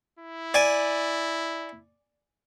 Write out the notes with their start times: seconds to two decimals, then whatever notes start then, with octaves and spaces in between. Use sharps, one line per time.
0.19 E4
0.54 D5 G#5